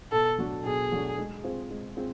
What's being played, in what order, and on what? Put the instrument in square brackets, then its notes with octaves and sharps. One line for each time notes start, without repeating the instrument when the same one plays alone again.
[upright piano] B2 [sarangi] A4
[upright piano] F#3 A3 D4 F#4
[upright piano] B2 [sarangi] G#4
[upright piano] F#3 A3 D4 F#4
G#3
C4 F4 G#4 C5
G#3
C4 F4 G#4 C5